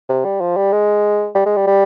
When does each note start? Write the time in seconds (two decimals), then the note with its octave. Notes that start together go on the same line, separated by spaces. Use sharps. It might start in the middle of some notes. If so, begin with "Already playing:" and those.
0.09 C3
0.25 G3
0.40 F3
0.57 G3
0.73 G#3
1.35 G3
1.46 G#3
1.56 G3
1.67 G3